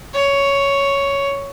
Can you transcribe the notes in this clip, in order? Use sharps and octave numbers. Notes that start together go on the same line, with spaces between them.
C#5